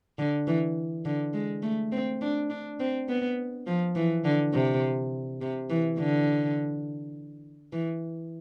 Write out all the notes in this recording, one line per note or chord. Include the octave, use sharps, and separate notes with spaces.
D3
E3
D3
G#3
A3
C4
D4
D4
C4
B3
F3
E3
D3
C3
C3
E3
D3
E3